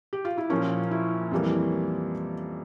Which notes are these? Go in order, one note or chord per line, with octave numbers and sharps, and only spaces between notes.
G4
F4
E4
A#2 F3 A#3 C#4
E4
F2 E3 G3 A#3